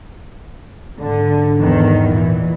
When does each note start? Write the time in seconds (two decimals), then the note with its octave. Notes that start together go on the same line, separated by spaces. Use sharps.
0.99 G#2 D3
1.59 E2 G#2 D#3
2.07 A#2 E3